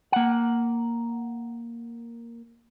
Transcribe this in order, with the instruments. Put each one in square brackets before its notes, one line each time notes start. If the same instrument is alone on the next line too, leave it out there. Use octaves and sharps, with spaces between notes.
[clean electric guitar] A#3 F#5